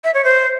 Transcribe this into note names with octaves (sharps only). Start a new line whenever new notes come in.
E5
C#5
C5